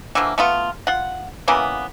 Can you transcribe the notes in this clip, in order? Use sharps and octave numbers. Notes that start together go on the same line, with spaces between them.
D3 E3 F3 A#3
A3 B3 F4
F4 F#5
C#3 E3 A#3 B3